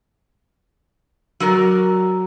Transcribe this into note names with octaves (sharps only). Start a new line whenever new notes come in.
F#3 F#4 A#4 D5